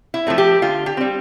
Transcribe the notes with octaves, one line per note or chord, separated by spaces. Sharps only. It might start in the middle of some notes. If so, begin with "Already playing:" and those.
E4
F3 A3 C4
G4
D3 F4
G4
G3 C4